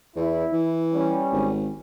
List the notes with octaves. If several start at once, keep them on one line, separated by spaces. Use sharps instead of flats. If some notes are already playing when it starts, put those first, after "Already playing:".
E2 E4
E3
G3 C#4
G#1